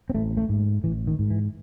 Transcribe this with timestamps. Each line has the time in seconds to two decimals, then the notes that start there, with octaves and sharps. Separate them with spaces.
0.10 C4
0.15 A1 A3
0.37 A3
0.49 G#2
0.84 A1 E3
1.07 D#3
1.19 G#2
1.30 E3